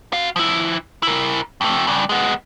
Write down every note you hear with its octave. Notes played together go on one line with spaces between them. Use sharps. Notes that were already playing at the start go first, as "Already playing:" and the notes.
F#4 F5
F3 E4
E4 A#4
F2 A3
G2 C#3
G#3 B3